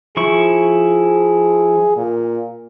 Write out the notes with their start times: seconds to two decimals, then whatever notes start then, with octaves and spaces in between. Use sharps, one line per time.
0.17 F3 E4 G#4 C#6
1.96 A#2